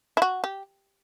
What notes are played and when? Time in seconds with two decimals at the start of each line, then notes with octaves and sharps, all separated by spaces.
0.17 E4
0.22 F#4
0.44 G4